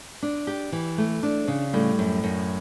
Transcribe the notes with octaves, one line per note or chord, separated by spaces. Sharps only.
D4
G4
E3
A3
D4
C#3
A2 G3
F#2
F#2